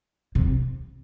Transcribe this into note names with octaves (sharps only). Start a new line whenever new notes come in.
C3